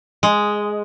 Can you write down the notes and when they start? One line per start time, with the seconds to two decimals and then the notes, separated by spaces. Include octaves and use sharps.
0.23 G#3